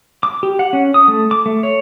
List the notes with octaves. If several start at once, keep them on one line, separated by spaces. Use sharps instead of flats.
D6
G4
F#5
C#4
D#6
A3
D6
A3
C#5